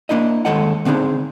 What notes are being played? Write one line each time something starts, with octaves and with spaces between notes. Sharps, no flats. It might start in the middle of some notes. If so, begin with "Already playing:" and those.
A#3 D4 E4 D#5
D#2 D#3 G#3 A4 D#5 F#5
D3 C4 D4 D#4 G#4